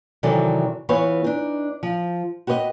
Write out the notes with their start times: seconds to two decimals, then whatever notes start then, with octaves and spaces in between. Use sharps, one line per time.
0.23 C3 D#3 E3 F#3 A4 D5
0.89 E3 B3 F4 B4 C#5
1.24 D4 D#4
1.83 F3
2.47 F#4 G4 B4 C#5 D#5